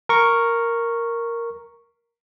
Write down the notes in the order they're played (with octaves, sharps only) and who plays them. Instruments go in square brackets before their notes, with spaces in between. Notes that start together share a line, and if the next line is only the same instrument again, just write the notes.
[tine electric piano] A#4 C#6